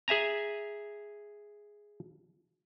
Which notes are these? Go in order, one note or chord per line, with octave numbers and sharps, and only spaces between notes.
G#4 E5 G#5 A#5